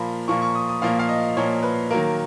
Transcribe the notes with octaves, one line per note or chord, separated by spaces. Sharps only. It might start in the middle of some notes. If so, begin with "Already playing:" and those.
Already playing: A#2 F3 A#3 B5
A#2 F3 A#3 C#6
C#6
D#6
D#6
A#2 F3 A#3 F5
F5
D#5
A#2 F3 A#3 C#5
B4
D#3 F#3 A#3 A#4